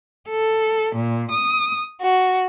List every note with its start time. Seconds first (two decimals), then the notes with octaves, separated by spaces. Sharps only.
0.29 A4
0.95 A#2
1.31 D#6
2.01 F#4